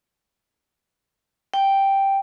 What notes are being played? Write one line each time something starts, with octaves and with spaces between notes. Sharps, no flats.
G5